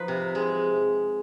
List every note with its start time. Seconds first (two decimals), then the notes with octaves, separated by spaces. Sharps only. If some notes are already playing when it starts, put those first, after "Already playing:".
Already playing: F3 D#4 B4
0.08 C3
0.35 G#3